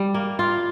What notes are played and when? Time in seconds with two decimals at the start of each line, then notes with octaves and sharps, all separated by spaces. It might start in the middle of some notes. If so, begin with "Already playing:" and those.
Already playing: G3
0.14 A#3
0.39 F4